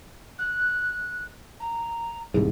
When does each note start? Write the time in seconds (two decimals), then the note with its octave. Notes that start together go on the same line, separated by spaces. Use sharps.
0.38 F#6
1.60 A#5
2.34 D#1 C2 G#2